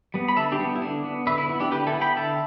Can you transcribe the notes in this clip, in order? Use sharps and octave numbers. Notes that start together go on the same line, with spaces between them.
G3 B3
B5
D3 E5 A5
D4 G4
G3 B3
E4
D3 D4
B3
D3 B4 E5
E4
B3 E4
D4 G4
D3 G4 B4
E4 A4
B3
G5 B5
D3 E5 A5